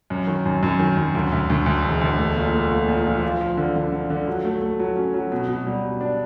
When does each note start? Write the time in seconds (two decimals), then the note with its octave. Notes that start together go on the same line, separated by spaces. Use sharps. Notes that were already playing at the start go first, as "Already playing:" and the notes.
0.10 F#2
0.27 D#3
0.46 F#2
0.63 F#2
0.79 D#3
0.97 F#2
1.15 D2
1.32 D2
1.50 D2
1.66 D2
1.84 E1
2.01 D2
2.18 A3
2.36 A#2
2.54 A3
2.71 A#2
2.88 A#2
3.06 F3
3.24 F3
3.41 F3
3.57 D3
3.76 D3
3.92 D3
4.10 D3
4.27 F#3
4.45 A3
4.61 A3
4.79 F#3
4.96 C#4
5.14 F#3
5.32 B2
5.48 B2
5.67 G3
5.84 B2
6.01 D4